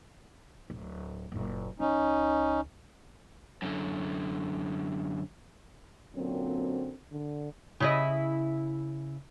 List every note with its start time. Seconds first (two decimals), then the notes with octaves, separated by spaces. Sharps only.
0.70 D1
1.32 F#1 A#2
1.80 C#2 C#4 D#4
3.62 F#2 D3
6.16 F#2 A#2 D3 F#3 C4
7.11 D3
7.80 C#3 E4 D#5